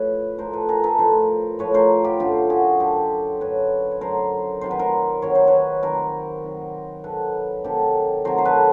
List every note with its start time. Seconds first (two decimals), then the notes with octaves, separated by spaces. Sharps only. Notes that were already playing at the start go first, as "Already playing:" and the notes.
Already playing: A2 F3 B4 C#5
0.38 A2 F3 A#4 C5
0.53 A4 B4
0.69 G#4 A#4
0.84 A4 B4
0.98 A2 F3 A#4 C5
1.59 A2 F3 B4 C#5
1.74 A#4 C5
2.04 F4 G4
2.20 F#2 D3 F#3 F4 G4
2.50 F#4 G#4
2.80 F#2 D3 F#3 G4 A4
3.41 F#2 D3 F#3 B4 C#5
3.91 C#5
4.01 F#2 D3 F#3 A#4 C5
4.61 C3 D#3 F#3 C5
4.71 B4
4.79 A#4 C5
5.22 C3 D#3 F#3 C#5
5.35 C5
5.47 B4 C#5
5.83 C3 D#3 F#3 A#4 C5
6.44 C3 D#3 F#3
7.04 C3 D#3 F#3 A4 B4
7.64 C3 D#3 F#3 G4 A4
8.25 C3 D#3 F#3 A#4 C5
8.38 C5
8.45 A4 B4